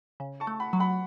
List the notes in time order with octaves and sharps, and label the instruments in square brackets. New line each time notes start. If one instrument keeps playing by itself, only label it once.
[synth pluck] C#3
[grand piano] A5 C#6
[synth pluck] A3
[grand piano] F#5 B5
[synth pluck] F#3
[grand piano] F#5 B5